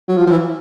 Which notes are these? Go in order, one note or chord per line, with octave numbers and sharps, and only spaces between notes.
F#3
F3
F3
E3